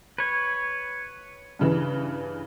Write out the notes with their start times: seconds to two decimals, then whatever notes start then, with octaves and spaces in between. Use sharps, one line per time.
0.18 B4 C#5
1.59 G2 C#3 E3